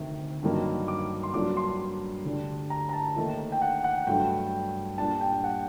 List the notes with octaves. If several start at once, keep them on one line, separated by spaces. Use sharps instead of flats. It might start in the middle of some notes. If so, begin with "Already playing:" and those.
Already playing: D2 C3 D#3
G2 D#3 F#3 A#3 D#4
D6
C6
G2 F#3 A#3 D4 D6
C6
D2 D3 G3 D4
A#5
A#5
A5
D#2 D#3 A3 D#4
G5
F#5
F#5
G2 F#3 A3 D4 G5
A#2 G3 D4 A5
G5
F#5